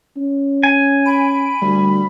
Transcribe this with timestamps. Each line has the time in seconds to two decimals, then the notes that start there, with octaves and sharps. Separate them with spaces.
0.17 C#4
0.63 G#5
1.06 B5 D7
1.62 D2 G3